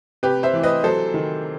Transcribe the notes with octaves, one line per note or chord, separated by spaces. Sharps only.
C3 G4 B4
C5 E5
E3
B4 D#5
F#3 A4 C5
D#3